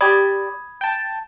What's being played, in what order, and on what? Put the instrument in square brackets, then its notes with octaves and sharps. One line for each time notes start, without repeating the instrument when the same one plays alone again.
[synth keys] G4 D5 [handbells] B5 D#6 G#6
[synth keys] G5 A5